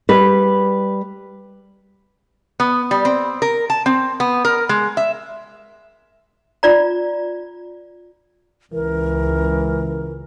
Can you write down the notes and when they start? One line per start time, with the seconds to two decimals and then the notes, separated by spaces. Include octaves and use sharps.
0.09 G3 B4
2.60 B3
2.91 G3
3.05 C4
3.42 A#4
3.70 A5
3.86 C4
4.20 B3
4.45 A#4
4.69 G#3
4.97 E5
6.63 F4 D5 A#5
8.73 C#2 E3 A#4